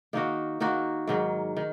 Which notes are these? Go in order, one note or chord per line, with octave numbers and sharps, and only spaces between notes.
D#3 A#3 D#4 F#4
D#3 A#3 D#4 F#4
G#2 D#3 F#3
D#3